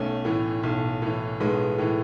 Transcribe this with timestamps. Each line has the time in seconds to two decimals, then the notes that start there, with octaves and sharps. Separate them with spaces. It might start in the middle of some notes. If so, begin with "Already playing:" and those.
Already playing: B1 A3 C#4
0.25 A2 E3
0.63 B1
1.02 A2 E3
1.40 B1 G#3 B3
1.78 A2 E3